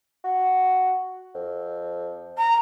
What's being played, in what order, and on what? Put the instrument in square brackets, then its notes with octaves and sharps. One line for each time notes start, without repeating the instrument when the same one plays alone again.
[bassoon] F#4
F2
[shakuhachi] A#5